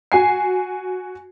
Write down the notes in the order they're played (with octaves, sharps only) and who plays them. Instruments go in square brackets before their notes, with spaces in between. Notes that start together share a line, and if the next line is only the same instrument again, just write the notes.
[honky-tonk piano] F#4 G#5 C7